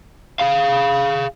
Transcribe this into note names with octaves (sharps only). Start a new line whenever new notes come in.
G#4 F5